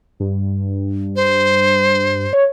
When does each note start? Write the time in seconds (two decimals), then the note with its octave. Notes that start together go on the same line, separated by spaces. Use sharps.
0.20 G2
1.16 C5
2.33 C#5